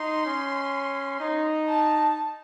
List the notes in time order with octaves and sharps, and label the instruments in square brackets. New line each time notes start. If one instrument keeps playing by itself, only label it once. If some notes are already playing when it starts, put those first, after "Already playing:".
Already playing: [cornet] D#4 [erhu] C6
[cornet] C#4
D#4
[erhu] A5